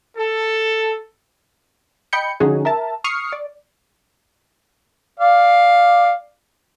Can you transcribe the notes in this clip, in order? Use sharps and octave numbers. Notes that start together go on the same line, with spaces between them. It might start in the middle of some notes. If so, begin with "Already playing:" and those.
A4
D#5 G5 B5 G6 C#7
D3 F3 C#4 D#4 F#4 G#4
A#4 E5 A5
C#6 D#6 F6 C7 C#7
D5
D5 F5